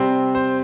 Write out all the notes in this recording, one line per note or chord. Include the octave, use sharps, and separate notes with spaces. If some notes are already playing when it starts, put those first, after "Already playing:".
Already playing: C3 G3 C4 C5
C5